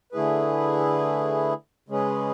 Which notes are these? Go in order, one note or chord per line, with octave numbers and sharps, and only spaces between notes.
D3 A3 E4 G#4 B4
C#3 G#3 C#4 G#4 B4